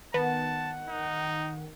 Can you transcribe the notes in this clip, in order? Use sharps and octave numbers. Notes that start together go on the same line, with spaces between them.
D#3 B3 F#5 A5
D#4